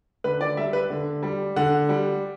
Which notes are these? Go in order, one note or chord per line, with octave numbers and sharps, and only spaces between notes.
D3 B4
D5
G3 E5
B4
D3
G3
D3 F#5
G3